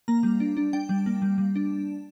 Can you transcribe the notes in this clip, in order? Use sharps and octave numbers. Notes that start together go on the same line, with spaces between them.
A#3 A#5
G3
D4
D4
D4 G5
G3
A#3
G3
G3
D4